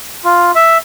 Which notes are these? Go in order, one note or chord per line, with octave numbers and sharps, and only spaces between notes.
F4
E5